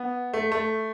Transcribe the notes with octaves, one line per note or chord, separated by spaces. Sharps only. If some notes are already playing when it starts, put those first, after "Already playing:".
Already playing: B3
A3
A3